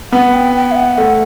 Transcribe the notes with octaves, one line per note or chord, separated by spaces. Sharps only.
B3 F#5
G5
G5
E5
F#5
A3